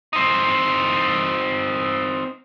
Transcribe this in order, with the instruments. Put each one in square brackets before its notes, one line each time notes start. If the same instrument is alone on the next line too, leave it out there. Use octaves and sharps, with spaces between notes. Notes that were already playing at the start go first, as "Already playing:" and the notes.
[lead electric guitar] C4 D#4